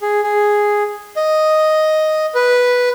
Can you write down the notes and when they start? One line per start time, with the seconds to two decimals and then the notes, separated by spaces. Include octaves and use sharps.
0.02 G#4
0.23 G#4
1.16 D#5
2.35 B4